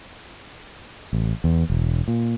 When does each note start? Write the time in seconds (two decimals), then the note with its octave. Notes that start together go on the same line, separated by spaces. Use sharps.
1.13 A1
1.44 E2
1.70 E1
2.08 A#2